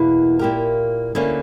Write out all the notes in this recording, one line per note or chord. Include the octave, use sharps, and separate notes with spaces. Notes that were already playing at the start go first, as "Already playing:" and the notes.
Already playing: E2 B2 A#3 E4 B4
A#2 A#3 E4 G4 A#4
D2 D3 A#3 C#4 E4